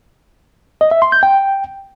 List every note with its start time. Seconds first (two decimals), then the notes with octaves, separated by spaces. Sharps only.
0.81 D#5
0.91 E5
1.02 C6
1.12 G6
1.23 G5